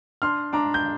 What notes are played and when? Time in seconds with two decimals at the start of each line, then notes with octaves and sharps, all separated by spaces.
0.22 D4 C6 F6
0.53 D4 A#5 D6
0.74 G6